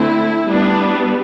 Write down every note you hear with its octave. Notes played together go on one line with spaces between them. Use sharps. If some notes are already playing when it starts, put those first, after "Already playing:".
Already playing: D3 A3 C4 E4
G3 B3 D4